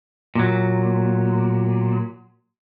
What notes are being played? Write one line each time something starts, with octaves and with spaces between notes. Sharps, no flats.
A#2 F#3